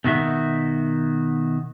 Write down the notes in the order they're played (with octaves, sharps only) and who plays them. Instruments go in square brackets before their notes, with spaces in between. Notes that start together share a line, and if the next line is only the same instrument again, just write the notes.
[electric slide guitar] B2 D#3 F#4 E5